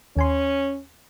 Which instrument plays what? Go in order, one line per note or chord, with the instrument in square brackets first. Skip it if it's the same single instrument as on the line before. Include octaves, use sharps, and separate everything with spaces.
[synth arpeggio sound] D#2 G#5 C6 [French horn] C#4